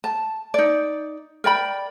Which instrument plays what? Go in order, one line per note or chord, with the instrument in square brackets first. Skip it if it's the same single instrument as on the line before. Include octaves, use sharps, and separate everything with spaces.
[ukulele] A5
D#4 D5
A#4 D5 G5 B5